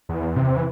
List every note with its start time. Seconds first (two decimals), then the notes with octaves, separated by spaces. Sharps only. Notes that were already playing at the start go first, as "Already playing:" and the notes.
0.09 E2
0.36 C3
0.56 E3